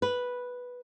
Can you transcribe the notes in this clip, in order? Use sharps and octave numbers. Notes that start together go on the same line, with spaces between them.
B4